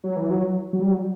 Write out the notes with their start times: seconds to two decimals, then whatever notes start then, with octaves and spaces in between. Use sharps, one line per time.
0.04 F#3
0.16 E3
0.31 F#3
0.73 F#3
0.82 G3
0.91 F#3